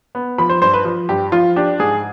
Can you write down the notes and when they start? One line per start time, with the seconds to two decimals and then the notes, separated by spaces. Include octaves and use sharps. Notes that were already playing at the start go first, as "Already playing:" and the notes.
0.15 B3
0.38 F3 B5
0.50 C5
0.62 G2 C5
0.74 B4
0.85 F3
1.09 G2 G4
1.32 F3 F4
1.56 D4 G4
1.79 G#2 G#4